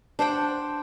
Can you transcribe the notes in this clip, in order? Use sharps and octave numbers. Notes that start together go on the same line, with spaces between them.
D4 C5 F#5 G5